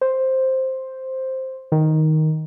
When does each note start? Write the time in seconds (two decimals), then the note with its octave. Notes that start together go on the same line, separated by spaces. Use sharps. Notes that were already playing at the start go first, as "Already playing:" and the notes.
0.01 C5
1.72 D#3